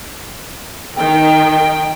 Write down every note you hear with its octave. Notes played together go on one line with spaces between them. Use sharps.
D#3 G5